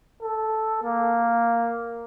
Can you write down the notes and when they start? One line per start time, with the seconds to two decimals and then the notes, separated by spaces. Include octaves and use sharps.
0.23 A4
0.83 A#3